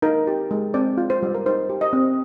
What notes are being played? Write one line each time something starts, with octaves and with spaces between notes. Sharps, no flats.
D#4 A#4
G4
G#3
C4 D5
F4
C5
G3
A#4
D#4 C5
G4
D#5
C4